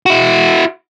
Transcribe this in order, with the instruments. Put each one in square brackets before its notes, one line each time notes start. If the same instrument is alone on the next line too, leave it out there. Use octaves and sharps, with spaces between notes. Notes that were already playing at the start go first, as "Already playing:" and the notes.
[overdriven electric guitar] E4 F#4